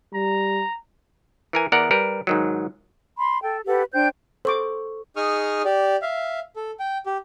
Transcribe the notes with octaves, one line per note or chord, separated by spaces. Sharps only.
G3 A#5
E3 A#4 G#5
E2 B3 A#4 D5 F#5
G3 A#4 B4
G#2 D#3 F#3
B5 C6
A4 G5
G4 A4 B4 F#5
D4 C5 G5 G6
A4 C5 C#6 D6
D#4 G#4 C#6 D#6 F6
G4 D5
E5 F5
A4
G5
G4